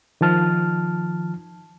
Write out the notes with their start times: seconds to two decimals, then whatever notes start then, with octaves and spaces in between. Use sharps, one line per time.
0.21 D#3 F3 A5 F6